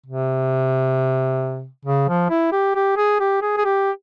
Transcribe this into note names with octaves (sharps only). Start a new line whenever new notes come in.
C3
C#3
F3
E4
G4
G4
G#4
G4
G#4
G#4
G4